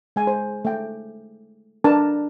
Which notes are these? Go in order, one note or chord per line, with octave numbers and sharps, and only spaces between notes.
G#3 G#5
C5
A3 G5
D4 A#4 B4 A5